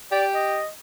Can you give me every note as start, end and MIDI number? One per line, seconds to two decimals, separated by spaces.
0.12 0.62 67
0.12 0.25 74
0.33 0.68 75